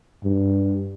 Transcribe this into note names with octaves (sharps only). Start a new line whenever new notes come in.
G2